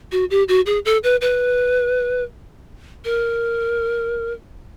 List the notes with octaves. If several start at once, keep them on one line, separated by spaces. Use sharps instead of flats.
F#4
G4
F#4
G#4
A4
B4
B4
A#4